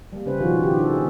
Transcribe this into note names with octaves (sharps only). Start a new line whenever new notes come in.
G3 A#3
C#3 C#4 B4 C5
B2 D#3 F3 D4 F4 F#4
D#3 F4 G4
C#4 D4 A4
A#3 G#4